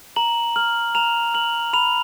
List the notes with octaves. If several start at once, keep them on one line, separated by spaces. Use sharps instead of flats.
A#5 F#7
F6 F#7
A#5 F7
F6 F#7
B5 F7